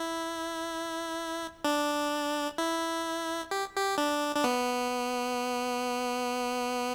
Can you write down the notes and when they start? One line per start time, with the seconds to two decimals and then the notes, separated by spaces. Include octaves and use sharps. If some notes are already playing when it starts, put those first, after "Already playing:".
Already playing: E4
1.64 D4
2.58 E4
3.51 G4
3.77 G4
3.98 D4
4.36 D4
4.44 B3